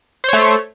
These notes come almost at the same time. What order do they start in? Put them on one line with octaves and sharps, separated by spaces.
C5 C#5 A3